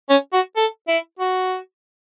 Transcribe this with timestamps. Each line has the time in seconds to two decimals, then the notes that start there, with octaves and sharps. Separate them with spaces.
0.09 C#4
0.33 F#4
0.56 A4
0.88 E4
1.19 F#4